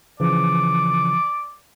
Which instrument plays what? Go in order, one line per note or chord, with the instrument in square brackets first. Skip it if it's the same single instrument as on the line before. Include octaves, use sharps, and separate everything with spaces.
[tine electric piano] C#3 E3 F3 [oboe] D5